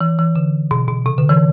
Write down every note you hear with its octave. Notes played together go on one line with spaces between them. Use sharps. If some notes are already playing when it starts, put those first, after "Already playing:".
E3
E3
D3
B2
B2
C3
D3
E3